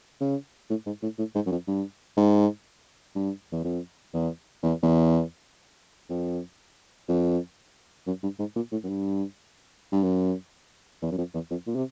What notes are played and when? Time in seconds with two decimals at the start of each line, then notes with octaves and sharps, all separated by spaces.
0.21 C#3
0.70 A2
0.86 G#2
1.02 A2
1.18 A2
1.35 G#2
1.46 F#2
1.51 F2
1.67 G2
2.17 G#2
3.15 G2
3.52 E2
3.64 F2
4.14 E2
4.63 E2
4.83 E2
6.10 F2
7.09 F2
8.07 F#2
8.23 G2
8.39 G#2
8.56 A#2
8.72 A2
8.84 F#2
8.89 G2
9.92 G2
10.03 F#2
11.02 E2
11.11 F#2
11.18 F2
11.34 E2
11.51 F2
11.67 A#2
11.75 C3